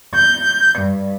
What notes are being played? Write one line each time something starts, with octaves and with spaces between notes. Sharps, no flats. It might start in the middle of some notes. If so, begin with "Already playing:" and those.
G6
G2